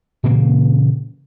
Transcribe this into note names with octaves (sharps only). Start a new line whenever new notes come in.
A#2 C#3 E3 A#3